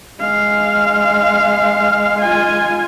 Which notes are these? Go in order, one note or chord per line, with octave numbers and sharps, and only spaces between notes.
G#3 F5
F4 G#5